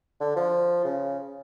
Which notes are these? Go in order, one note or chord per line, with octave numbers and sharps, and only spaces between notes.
D3
F3
C#3